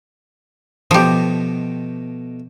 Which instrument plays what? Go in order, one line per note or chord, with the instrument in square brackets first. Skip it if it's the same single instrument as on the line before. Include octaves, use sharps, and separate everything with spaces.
[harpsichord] B2 A3 D#5 [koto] F3 G4